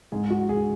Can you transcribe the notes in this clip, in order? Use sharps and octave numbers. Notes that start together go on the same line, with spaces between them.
G#2 G#3 G#4
F#4
G#4